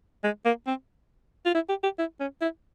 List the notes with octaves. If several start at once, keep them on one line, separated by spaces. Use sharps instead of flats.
G#3
A#3
C4
F4
E4
G4
G4
E4
C#4
E4